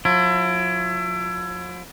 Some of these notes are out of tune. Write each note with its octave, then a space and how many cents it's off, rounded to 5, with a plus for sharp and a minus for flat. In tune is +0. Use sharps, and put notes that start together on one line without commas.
F3 +45 E4 +30